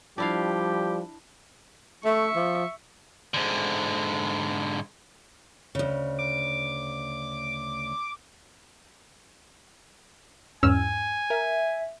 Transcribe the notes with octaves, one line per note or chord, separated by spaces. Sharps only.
F3 G3 D4 E4 G4 F5
A3 E5 C#6
F3
G#2 D3
D2 C#3
D6
E2 G#2 C#4 G#5 E6 F6
A#4 E5